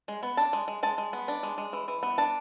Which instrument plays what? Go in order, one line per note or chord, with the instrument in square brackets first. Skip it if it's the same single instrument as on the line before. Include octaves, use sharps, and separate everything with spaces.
[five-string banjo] G#3
B3
D4 A5
G#3
G#3
G#3 A5
G#3
B3
D4
G#3
G#3
E3
E3
B3
D4 A5